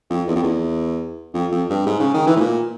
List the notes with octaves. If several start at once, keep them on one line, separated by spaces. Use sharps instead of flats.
F2
E2
F2
E2
F2
F2
G2
G#2
C#3
D#3
E3
A2
A#2